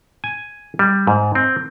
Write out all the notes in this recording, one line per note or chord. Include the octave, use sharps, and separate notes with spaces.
G#5
G3
G#2
C4